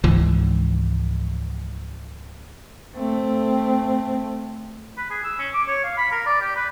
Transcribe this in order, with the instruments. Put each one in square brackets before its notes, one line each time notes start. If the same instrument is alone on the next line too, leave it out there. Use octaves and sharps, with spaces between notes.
[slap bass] C#2 G#2 E3 F3
[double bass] A3 C4
[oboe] B4
G#4
E6
C#4
D6
C#5
F5
B5
A#4
D5
G4
B4